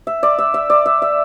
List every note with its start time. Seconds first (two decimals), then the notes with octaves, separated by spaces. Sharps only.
0.07 E5
0.23 D5
0.38 E5
0.54 E5
0.70 D5
0.86 E5
1.02 E5